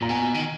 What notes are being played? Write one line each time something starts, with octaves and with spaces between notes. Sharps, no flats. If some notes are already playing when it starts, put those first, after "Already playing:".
A#2 A#5
B2 G#5
D#3